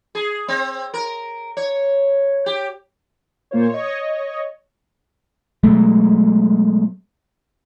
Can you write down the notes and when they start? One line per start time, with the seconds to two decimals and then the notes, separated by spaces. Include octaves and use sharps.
0.15 G#4
0.48 C4
0.94 A#4
1.57 C#5
2.46 G4
3.51 A#2 A#3 F4 C5 C#5
3.69 C#5 D#5
5.63 B2 F#3 G#3 A3